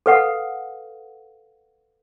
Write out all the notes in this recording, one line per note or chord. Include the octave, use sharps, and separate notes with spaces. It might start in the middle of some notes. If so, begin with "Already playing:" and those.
A4 B4 F5 F#5